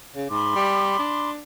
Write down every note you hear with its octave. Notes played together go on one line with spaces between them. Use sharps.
C#3
G#2 B5 C6 D6
G3
D4